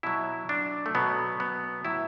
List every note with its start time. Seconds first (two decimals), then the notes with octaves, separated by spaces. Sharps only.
0.03 B2 F#3 E4
0.49 D4
0.86 A3
0.95 B2 F#3 B3
1.40 B3
1.85 A2 F#3 E4